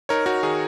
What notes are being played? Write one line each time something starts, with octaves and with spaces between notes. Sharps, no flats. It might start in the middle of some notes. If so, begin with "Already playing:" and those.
D#4 A#4 C#5
D#4 F#4 A#4
D#3 G#4